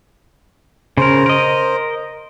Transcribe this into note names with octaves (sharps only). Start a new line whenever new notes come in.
C#3 A#4 C5
A#4 D#5